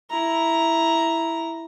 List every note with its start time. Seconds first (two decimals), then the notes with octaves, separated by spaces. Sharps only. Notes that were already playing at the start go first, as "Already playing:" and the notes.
0.10 E4 A#5